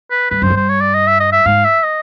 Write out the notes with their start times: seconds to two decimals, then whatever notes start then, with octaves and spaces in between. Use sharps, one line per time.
0.11 B4
0.31 G2 B4
0.42 F#2 C5
0.50 G2
0.56 C5
0.69 C#5
0.81 D5
0.94 D#5
1.07 E5
1.20 D#5
1.32 E5
1.45 G#2 F5
1.65 E5
1.83 D#5